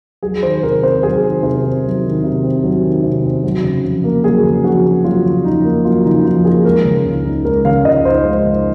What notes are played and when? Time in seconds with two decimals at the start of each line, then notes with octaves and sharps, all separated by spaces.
0.23 F#3 G#4
0.43 D#3 C5
0.63 C3 A#4
0.83 C4 C5
1.03 F#3 G#4
1.23 D#3
1.43 C3 C5
1.63 C4
1.83 F#3
2.04 D#3
2.24 C3
2.43 C4
2.64 F#3
2.83 D#3
3.04 C3
3.23 C4
3.43 F#3
3.63 C#3
3.84 F2
4.04 A#3
4.24 F#3 G#4
4.44 C#3
4.64 F2 F#4
4.84 A#3
5.04 F#3 F4
5.24 C#3
5.44 F2 D#4
5.64 A#3
5.84 F#3 F4
6.04 C#3 D#4
6.24 F2 F4
6.44 A#3 G#4
6.64 G#3 A#4
6.85 C#3
7.05 C#2
7.25 D#4
7.45 G#3 A#4
7.65 C#3 F5
7.85 C#2 D#5
8.05 D#4 C5
8.25 G#3
8.45 C#3